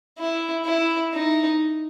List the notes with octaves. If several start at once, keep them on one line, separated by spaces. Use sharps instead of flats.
E4
E4
D#4